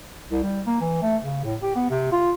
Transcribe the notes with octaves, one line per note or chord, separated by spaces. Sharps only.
C2
G3
A#3
E3
A3
C#3
A2
G4
B3
C3
F4